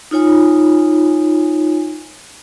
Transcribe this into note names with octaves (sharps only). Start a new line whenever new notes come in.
D#4 F4 C#5 G#5